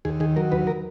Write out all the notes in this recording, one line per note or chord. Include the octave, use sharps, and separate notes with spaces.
D#2 G#4
D#3 G#4
F#3 A#4
D#2 B4
A#4